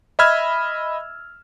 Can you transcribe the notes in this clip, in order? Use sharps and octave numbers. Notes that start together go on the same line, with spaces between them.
D#5 E5 B5 E6 F6 G#6